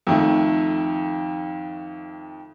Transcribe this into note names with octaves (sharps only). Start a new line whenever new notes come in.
F2 D#3 A3